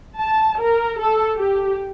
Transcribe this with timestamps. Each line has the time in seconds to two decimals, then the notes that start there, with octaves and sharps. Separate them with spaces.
0.19 A5
0.60 A#4
1.00 A4
1.37 G4